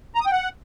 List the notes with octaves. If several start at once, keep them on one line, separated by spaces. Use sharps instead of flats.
A#5
D#6
G5
F#5